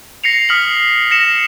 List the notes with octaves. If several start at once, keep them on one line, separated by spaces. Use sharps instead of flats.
A#6 C7 C#7 F7
D#6 F6 B6 F#7
A#6 C#7 E7